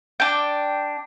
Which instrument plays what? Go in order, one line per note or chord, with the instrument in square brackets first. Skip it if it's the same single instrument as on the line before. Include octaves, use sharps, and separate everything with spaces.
[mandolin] D4 G5